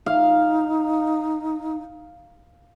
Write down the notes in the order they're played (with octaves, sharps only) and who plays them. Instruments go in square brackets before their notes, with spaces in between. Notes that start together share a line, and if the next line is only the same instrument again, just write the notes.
[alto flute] D#4 [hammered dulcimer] F5